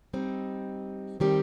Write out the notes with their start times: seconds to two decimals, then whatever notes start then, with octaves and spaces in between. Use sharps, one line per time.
0.13 G3 C4 D#4
1.20 D#3 G3 C4 G4